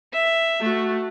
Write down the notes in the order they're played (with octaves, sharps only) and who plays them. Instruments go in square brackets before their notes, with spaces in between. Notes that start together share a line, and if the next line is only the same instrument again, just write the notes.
[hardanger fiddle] E5
[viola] A3 F#4